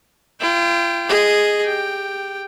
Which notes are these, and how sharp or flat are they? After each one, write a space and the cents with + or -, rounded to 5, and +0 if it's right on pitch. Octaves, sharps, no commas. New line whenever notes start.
F4 -40 G5 +0
G#4 +0 D#5 -5
G4 +15 G5 +0